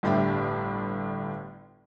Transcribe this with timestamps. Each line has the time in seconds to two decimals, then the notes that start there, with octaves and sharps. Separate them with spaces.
0.03 G1 A2 G3 D4 E5 G5